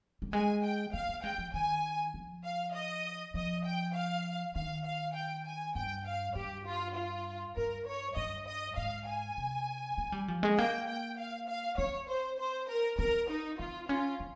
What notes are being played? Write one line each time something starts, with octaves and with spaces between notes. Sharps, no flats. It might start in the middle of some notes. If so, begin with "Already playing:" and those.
G3
G#3 G#5
G5
A#3 F5
A#3
G#3 G5
F3
D#3 G#5
F3
F5
D#5
F3 D#5
G5
F5
D#3 F5
F5
G5
G#5
G2 G5
F5
G2 G4
F4
F4
G2 A#4
C#5
G2 D#5
D#5
G#2 F5
G#5
C3
A#3
G3
F3
G#3
A#3 G5
G5
F5
F5
C4 C#5
C5
C5
A#4
C4 A#4
D#4
C4 F4
C#4 F4
C4